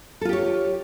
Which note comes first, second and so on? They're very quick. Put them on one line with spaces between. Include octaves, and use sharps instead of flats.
A4 F4 G4 C#5